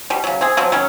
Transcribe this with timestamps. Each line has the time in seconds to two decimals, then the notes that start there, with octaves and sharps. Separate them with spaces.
0.10 B2 G3
0.24 C#3 F#3
0.41 C4 G#4
0.57 F3 F#3 C4
0.72 D#3 F#3 C#4